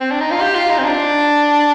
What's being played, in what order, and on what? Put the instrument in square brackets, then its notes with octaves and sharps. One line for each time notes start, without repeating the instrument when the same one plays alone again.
[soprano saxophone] C4
D4
D#4
F4
G4
F4
D#4
C4
D4